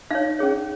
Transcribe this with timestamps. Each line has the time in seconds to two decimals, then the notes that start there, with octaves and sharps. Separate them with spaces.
0.11 D#4 C#5 F5
0.39 C#4 G#4 C#5